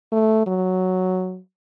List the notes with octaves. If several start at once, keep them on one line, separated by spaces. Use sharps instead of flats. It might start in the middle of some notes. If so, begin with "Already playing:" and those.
A3
F#3